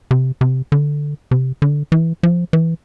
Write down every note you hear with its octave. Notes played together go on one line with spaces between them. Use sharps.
C3
C3
D3
C3
D3
E3
F3
E3